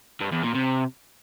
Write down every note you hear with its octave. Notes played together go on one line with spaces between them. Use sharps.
G2
E2
A#2
C3